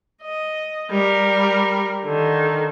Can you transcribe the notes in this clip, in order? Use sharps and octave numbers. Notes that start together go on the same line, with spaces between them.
D#5
G3 A#4
D3 D#3